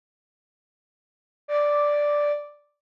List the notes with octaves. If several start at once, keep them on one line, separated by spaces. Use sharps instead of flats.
D5